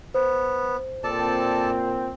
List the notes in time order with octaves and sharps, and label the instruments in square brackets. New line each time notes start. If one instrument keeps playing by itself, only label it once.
[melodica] B3 [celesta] C5
[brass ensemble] A#2 C4 [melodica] A4 D5 A5